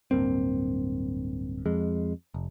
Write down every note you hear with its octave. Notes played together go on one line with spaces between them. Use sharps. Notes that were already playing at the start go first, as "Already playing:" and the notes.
D1 G2 A#3 C4
F2 G#3
F1